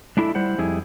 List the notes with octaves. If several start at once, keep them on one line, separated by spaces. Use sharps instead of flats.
G#3 D4 E4 F#4 A4 E5
G3 E4 C5 F#5
F2 G3 E4 G#4